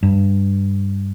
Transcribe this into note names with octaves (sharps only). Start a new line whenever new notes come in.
G2